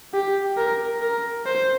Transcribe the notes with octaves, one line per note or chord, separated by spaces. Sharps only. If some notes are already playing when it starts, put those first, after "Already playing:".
G4
A#4
A#4
C5